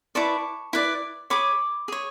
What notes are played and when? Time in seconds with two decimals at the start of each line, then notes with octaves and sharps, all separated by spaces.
0.15 E4 B4 D5 A5 C#6
0.73 E4 B4 D5
1.30 G#4 C#5 B5 D6
1.88 G#4 C#5